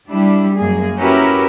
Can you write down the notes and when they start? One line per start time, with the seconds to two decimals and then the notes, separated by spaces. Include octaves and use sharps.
0.10 G3 D4 E4
0.57 F#2 A#3 G#4
0.99 C#4 E4 F#4 G4 A#4 B4